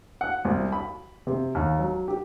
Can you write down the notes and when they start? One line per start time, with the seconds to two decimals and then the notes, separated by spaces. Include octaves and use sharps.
0.21 F#5
0.45 C2
0.72 B5
1.27 C3
1.55 D#2
1.79 F#3
2.08 G4